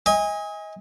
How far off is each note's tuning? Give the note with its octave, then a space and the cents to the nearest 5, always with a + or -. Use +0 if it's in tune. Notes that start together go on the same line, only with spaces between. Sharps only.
D#5 +30 G#5 -20